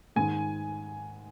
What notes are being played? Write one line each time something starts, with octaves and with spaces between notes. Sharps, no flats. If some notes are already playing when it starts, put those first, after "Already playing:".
G#2 D#3 G#3 G#5